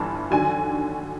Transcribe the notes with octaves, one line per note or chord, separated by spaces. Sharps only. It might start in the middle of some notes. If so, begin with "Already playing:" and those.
Already playing: G1 G2 E3 A5
D#2 D3 F#3 G#5